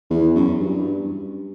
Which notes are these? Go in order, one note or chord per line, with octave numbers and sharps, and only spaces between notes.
E2
F#2
G2